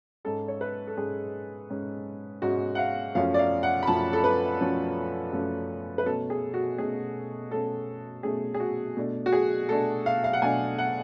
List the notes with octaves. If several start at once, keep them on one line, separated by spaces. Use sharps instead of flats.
G#2 G#3 C#4 A4
C#5
B4
A4
G#2 G#3 C#4 G#4
G#2 G#3 C#4
G#2 G#3 C#4 F#4
F#5
F5
F#2 F3 A3 C#4 F5
D5
F5
F#5
B5
F#2 F3 A3 C#4 A5
A4
B4
F#2 F3 A3 C#4
F#2 F3 A3 C#4
B4
B2 A3 C#4 A4
G#4
F#4
B2 A3 C#4 G#4
B2 A3 C#4 A4
B2 A3 C#4 G#4
G#4
F#4
B2 A3 D4
F#4
G#4
B2 A3 D4 A4
F5
F5
F#5
B2 A3 D4 G#5
F#5